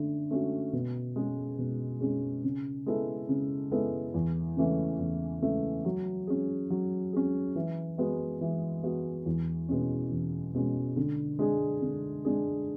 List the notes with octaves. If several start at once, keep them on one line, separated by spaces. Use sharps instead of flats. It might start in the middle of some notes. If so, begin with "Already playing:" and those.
Already playing: D3 A3 C#4
A3 C#4 F#4
B2
G#3 C#4 G#4
B2
G#3 C#4 G#4
C#3
G#3 B3 E4 A4
C#3
G#3 B3 E4 A4
E2
C#3 E3 A3 C#4
E2
C#3 E3 A3 C#4
F#3
C#4 G#4
F#3
C#4 G#4
E3
G#3 B3 F#4
E3
G#3 B3 F#4
E2
B2 G#3 C#4
E2
B2 G#3 C#4
D3
G#3 D4 G#4
D3
G#3 D4 G#4